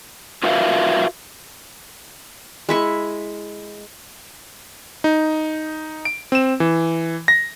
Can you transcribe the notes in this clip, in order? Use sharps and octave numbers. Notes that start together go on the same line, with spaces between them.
F4 F#4 A#4 B4 E5 F5
G#3 E4 C#6
D#4
D7
C4 E7
E3
A#6